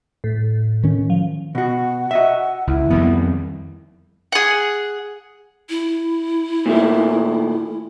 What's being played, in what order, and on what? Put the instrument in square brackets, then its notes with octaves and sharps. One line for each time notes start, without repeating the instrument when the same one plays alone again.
[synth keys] A2
[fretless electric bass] D#3 C#4
[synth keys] F3
[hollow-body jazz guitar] B2 F#4 [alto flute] F#5
[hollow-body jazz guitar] F#4 D#5 E5
[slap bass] C#2 [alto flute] E4
[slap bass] F2 D#3 G3 [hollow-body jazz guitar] B3
[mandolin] G#4 F#5
[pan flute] E4
[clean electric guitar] A#2 D#3 A3